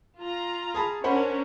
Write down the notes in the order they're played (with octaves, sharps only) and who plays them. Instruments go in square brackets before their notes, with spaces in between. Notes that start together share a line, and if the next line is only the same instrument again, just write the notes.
[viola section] F4 A#5
[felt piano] G#4 A5 B5
[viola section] C#4 D4 A#4 [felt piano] C5 F#5 B5